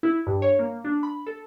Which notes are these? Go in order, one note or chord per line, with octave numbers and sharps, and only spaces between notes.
E4
G2
C#5
A#3
D4
B5
A4